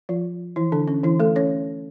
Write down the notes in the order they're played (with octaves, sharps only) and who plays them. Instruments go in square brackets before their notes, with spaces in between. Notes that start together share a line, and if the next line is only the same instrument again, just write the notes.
[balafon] F3 F4
E3 E4
D3 D4
C#4
E3 E4
A3 A4
C#4 C#5